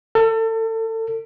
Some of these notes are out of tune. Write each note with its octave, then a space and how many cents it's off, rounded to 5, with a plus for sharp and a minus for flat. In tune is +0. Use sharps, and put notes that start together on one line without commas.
A4 +30